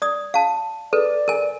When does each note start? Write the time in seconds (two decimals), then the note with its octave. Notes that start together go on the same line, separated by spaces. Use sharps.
0.02 D5 D#6
0.34 F5 A5
0.93 A4 B4 D5
1.28 A#4 G#5